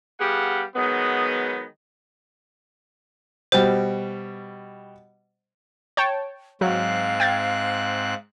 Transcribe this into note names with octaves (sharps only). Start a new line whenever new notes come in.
G3 B3 G4 G#4 F5 F#5
D#3 F#3 G#3 B3
B2 G3 C5
C#5 G5 A5
G#2 F#3 C4 F5 F#6
G5 G#6 A6